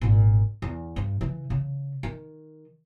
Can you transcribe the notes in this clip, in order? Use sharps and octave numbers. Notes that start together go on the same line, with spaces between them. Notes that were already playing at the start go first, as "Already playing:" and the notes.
G#1 A#2
E2
G2
C#3 E3
C#3
D#3